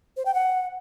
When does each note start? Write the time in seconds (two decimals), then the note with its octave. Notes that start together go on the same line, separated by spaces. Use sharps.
0.17 C5
0.25 G5
0.34 F#5